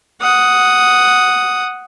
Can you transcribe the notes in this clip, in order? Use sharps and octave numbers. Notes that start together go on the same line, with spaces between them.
F#5 D#6